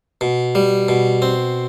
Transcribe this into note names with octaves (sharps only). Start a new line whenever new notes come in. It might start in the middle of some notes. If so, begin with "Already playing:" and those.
B2
G3
B2
C4